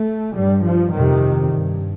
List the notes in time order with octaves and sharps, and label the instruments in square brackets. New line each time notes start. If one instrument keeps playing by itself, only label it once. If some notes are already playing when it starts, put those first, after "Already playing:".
Already playing: [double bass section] A3
G2 G3
F3
F2 C3 D#3
G2